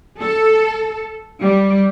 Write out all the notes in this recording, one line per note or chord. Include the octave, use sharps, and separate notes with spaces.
A4
G3